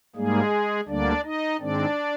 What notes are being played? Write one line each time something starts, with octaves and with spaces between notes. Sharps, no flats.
G#2 G3 G#3 A#3 G#4
D2 D3 G3 A#3 D4 D5
D#4 D#5
G#2 D#3 G#3 C4 D4 D5